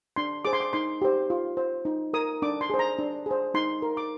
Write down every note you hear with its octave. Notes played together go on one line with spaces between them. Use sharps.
D4 C6
G#4 C5 D6
C6
D6
D#4 C6
G4 C5
F4
C5
D#4
A#4 D#6
D4 D6
C6
G#4 C5
A#5
D4
G#4 C5
D#4 C6
A#4
D6